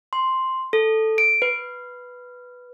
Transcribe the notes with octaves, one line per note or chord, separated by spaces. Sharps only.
C6
A4
D7
B4